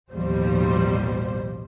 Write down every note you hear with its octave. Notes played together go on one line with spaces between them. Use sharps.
A1 D#2 B2 F3 G3 C5